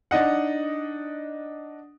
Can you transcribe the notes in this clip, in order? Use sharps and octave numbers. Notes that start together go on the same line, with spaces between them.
D4 D#4 D#5 F#5